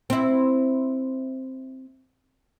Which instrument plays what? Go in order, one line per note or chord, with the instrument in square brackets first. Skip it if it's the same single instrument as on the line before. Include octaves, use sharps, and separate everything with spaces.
[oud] C4 E4